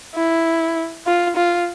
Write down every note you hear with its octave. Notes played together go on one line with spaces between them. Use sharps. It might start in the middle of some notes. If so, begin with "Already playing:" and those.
E4
F4
F4